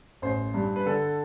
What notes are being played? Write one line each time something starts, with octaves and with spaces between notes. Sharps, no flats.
A1 C5
G2
B4
D3 A4